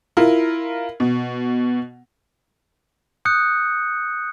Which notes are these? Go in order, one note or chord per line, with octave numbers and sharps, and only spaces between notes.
E4 F4 A#4
B2
D#6 F#6 G6 C#7